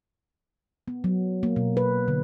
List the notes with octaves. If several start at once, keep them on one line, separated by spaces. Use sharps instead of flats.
B3
F#3
A#3
B2
B4
D3